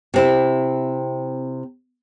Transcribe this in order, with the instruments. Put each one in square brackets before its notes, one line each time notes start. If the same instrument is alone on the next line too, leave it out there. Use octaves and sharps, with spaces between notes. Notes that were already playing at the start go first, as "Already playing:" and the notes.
[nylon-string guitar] C3 C4 E4